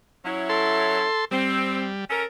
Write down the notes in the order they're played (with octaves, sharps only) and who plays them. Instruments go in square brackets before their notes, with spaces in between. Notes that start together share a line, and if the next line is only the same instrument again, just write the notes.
[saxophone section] F#3 C#4 E4
[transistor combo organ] A4 C6
[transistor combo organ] G3 [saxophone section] C4
[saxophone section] C#4 A4 A#4